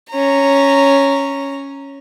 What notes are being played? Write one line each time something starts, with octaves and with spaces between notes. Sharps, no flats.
C#4 A#5